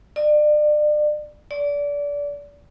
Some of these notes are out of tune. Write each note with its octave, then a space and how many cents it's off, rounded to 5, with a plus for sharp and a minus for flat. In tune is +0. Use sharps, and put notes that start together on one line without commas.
D5 +35
D5 -25